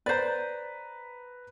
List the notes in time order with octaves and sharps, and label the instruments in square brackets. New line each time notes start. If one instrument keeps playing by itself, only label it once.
[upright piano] B4 A#5 [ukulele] C5 D5